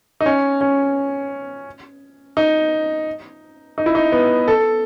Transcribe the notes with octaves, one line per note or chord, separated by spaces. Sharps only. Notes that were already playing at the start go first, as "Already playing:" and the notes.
D#4
C#4
C#4
D#4
D#4
E4
D#4
B3
A4